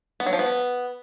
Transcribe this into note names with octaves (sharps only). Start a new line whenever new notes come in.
B3
F#3
F3
B3